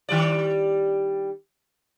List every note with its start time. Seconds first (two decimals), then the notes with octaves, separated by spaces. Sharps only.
0.09 D#3 G3 D5